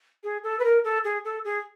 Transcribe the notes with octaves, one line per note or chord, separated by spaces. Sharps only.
G#4
A4
B4
A#4
A4
G#4
A4
G#4